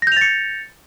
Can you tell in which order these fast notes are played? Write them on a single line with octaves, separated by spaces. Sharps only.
A#6 G6 F7 A6 C#7